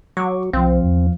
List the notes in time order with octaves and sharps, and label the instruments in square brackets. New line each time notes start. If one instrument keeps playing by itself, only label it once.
[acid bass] F#3 [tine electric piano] C#6 D6
[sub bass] C2 [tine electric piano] F3 F5 [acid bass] C4
[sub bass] E2